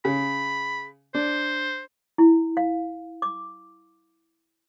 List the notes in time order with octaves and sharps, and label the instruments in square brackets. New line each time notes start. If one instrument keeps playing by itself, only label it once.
[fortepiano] C#3 [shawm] B5
[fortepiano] D4 [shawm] C5
[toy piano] E4
F5
D6